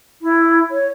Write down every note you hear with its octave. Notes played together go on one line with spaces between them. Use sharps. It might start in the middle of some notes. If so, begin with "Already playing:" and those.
E4
C#5